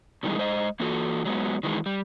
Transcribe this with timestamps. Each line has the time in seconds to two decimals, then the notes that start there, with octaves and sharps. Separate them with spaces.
0.23 B2 D#3 E3 G3 G#3
0.37 G#3 C5 D#5
0.80 E3 A#3 F4 F#4 A4
1.25 F#3 G#3 B3
1.63 D#3 E3 G#3
1.86 G3